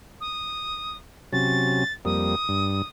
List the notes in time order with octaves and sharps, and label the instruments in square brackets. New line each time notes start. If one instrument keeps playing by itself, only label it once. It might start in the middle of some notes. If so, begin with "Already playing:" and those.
[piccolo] D#6
[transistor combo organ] C3 F#3 C#4 [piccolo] A6
[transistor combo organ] F2 G3 A#3 [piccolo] D#6
[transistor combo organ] G2